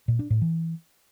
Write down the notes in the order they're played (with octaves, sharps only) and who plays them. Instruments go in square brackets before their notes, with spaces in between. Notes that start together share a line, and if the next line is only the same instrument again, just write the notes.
[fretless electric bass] A#2
D4
A2
E3